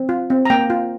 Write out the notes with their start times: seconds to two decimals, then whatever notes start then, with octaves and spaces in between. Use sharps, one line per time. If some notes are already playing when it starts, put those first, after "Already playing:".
Already playing: C4
0.09 F4
0.30 C4
0.45 A#5
0.50 A#3 G5
0.70 F4